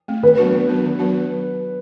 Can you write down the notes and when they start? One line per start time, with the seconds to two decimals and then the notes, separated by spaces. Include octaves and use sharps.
0.08 A3 C4
0.23 D#3 B4
0.38 F#3 B3 D4 F#4
0.53 D#3
0.68 F#3 B3 D4 F#4
0.83 D#3
0.99 F#3 B3 D4 F#4